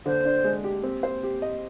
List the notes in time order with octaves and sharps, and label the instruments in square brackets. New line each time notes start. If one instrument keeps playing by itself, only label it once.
[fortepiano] D3 [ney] C5
[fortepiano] D4
G#3
G4
C4
C5
G4
D#5